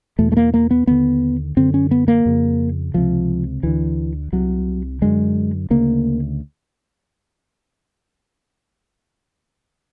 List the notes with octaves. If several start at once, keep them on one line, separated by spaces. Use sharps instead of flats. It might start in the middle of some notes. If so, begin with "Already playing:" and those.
E2 B2 A3
A3
A#3
A#3
B3
D#2 D3 B3
F#2 D3 C4
C#4
B3
A#3
F2 C#3
C#2 C3 F3
D2 D3 E3
C2 C3 F#3
F#2 D3 G#3
D2 C#3 A#3